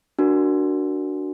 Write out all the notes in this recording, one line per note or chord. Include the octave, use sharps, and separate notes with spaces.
D4 F#4 A#4